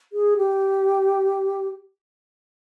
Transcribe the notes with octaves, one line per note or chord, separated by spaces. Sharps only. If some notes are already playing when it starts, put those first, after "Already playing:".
G#4
G4